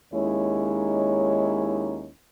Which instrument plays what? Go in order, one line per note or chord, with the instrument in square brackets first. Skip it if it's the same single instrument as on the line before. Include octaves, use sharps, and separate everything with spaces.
[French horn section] D#2 G#3 C#4 D#4 E4 C#5